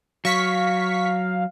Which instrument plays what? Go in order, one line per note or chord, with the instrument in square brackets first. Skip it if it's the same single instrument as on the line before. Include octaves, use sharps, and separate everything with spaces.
[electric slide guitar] F#3 [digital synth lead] F5 [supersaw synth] C#6 B6